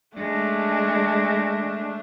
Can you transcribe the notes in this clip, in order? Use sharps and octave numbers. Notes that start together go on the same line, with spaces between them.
G#3 A3 D4